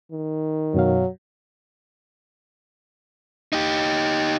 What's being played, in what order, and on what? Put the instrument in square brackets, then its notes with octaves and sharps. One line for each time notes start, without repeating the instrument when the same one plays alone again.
[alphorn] D#3
[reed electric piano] F#2 B2 F5 [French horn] F#3
[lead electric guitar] D#4 G4